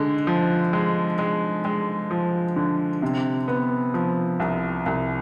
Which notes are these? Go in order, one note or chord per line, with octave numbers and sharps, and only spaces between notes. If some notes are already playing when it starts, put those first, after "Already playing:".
Already playing: D3 G#3
F3
G#3
G#3
G#3
F3
D3
C3
B3
F3
C2
C2